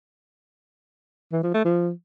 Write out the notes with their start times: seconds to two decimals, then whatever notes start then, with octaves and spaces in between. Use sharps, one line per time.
1.32 E3
1.43 F3
1.54 A3
1.65 F3